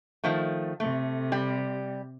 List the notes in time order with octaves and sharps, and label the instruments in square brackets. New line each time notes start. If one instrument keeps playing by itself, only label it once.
[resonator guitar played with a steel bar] D#3 F3 A3
[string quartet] C3 [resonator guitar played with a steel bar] A3
[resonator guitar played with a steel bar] G3 G4